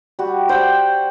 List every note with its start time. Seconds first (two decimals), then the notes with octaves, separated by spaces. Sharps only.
0.19 G3 F#4
0.49 C5 D5 F#5 G5